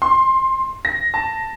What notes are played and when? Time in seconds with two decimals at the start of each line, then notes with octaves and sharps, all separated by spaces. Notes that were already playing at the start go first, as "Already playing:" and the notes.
0.02 C6
0.85 A#6
1.14 A5